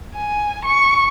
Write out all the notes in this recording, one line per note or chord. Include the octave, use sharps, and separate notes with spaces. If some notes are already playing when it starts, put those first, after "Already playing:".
G#5
C#6